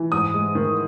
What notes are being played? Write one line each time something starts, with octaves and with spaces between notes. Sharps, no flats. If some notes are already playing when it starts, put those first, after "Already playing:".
Already playing: E3
G#2 D#6
G#3
D#3